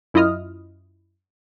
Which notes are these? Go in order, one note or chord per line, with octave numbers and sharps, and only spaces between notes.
F#2 E4 F4 D#5 D#6 F6